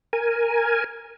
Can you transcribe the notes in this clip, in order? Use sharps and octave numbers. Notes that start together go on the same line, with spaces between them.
A#4 G#5